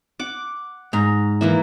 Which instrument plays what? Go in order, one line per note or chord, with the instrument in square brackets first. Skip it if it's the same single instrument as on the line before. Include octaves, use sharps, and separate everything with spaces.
[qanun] F#5 D6
[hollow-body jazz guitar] G#2 [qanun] A#5
[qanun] E3 A#3 E4